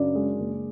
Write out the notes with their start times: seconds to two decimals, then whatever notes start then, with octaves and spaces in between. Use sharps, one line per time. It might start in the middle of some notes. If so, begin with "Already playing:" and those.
Already playing: F#2 C#3 D4 D5
0.15 G#3
0.39 F#1